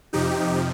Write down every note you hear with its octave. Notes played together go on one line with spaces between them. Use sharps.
F2 C3 F3 D#4 G4